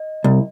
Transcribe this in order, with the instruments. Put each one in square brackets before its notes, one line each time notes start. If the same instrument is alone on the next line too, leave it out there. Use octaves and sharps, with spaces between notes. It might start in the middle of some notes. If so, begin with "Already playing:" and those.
Already playing: [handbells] D#5
[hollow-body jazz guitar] C2